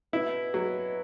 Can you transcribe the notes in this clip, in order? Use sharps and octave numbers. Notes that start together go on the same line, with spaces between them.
B2 E4
F#3